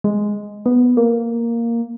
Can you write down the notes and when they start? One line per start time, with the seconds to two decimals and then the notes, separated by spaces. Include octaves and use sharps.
0.04 G#3
0.66 B3
0.97 A#3